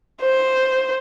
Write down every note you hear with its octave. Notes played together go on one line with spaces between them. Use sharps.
C5